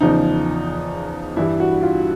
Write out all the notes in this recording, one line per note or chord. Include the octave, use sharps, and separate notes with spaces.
E2 C#3 F3 D#4
G2 E3 G3 E4
F#4
F4